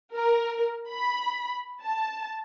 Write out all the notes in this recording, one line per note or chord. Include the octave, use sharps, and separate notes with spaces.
A#4
B5
A5